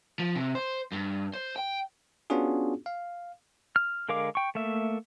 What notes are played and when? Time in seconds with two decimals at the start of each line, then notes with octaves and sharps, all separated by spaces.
0.19 F3
0.36 C3
0.55 C5
0.93 G2
1.33 C5
1.56 G5
2.30 B3 C#4 D4 F4 F#4 G#4
2.86 F5
3.76 F6
4.09 D3 G#3 A#4 F5 D6
4.35 G5 C#6
4.55 A3 A#3 E5